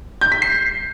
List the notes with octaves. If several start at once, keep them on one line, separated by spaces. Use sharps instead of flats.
G6
B6
C7